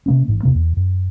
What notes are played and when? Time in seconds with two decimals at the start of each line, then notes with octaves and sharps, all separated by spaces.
0.06 C3 A#3 C#4
0.28 A1 G#2
0.43 E2 C3 A#3
0.55 E2
0.77 F#2